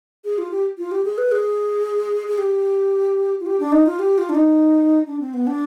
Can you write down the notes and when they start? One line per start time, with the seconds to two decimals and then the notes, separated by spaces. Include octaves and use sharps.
0.25 G#4
0.38 F4
0.51 G4
0.78 F4
0.91 G4
1.05 G#4
1.18 B4
1.32 G#4
2.28 G#4
2.38 G4
3.40 F4
3.46 G4
3.60 D4
3.72 D#4
3.86 F4
3.99 G4
4.18 F4
4.29 D4
4.35 D#4
5.07 D4
5.20 C4
5.34 B3
5.47 D4